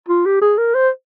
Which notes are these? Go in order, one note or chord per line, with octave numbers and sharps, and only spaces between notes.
F4
G4
G#4
A#4
C5